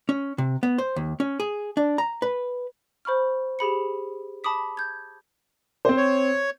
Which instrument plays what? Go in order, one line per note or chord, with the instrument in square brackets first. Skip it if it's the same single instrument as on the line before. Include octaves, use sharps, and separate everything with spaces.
[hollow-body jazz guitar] C#4
C3
B3
C5
D#2
C#4
G#4
D4
A#5
B4
[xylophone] C5 B5 C#6 F6
G4 G#4 B5 C#7
A5 B5 D6 D#6 B6
G6 G#6
[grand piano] C4 C5
[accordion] C#5